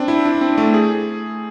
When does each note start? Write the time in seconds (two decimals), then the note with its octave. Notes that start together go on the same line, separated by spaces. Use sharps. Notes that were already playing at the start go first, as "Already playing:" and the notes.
Already playing: C4 D4
0.08 E4
0.25 D4
0.41 C4
0.58 A3
0.74 G#4